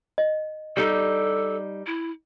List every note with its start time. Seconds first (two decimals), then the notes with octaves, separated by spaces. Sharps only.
0.18 D#5
0.77 G3 D#4 A4
1.86 E4